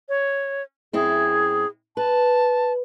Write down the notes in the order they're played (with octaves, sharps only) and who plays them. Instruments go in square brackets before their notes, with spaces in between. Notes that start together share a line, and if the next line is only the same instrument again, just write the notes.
[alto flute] C#5
[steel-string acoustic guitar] F#2 C4 E4 [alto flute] G#4
[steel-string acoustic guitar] B4 [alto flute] A5